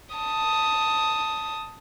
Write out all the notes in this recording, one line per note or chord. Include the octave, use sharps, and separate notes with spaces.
A5 D#6